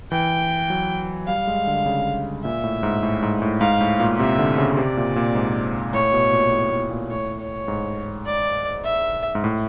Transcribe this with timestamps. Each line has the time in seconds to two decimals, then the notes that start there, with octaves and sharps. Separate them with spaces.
0.12 E3 G5
0.70 F#3
1.28 G3 F5
1.47 G#3
1.67 D3
1.86 C#3
2.44 A#2 E5
2.64 A2
2.83 G#2
3.03 A2
3.22 G#2
3.42 A2
3.61 G#2 F5
3.81 A2
4.00 A#2
4.19 C3 E5
4.38 D3
4.58 C#3
4.77 C3 D5
4.97 A#2
5.16 A#2
5.35 G#2
5.94 A2 C#5
6.13 B2
6.33 A#2
6.52 A2
6.71 A2
6.91 A#2
7.10 A2 C#5
7.40 C#5
7.68 G#2
8.26 D5
8.85 E5
9.35 G#2
9.44 A2